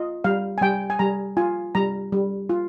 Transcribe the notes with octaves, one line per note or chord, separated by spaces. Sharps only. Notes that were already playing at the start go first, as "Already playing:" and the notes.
Already playing: F4 D#5
G3 F5
G#5
G3 G5
G#5
G3 A#5
F4 G#5
G3 A#5
G3
F4